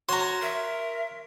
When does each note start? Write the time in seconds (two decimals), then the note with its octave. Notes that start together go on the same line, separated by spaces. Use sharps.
0.09 F#4 C#5 A#5 C6
0.42 A#4 E5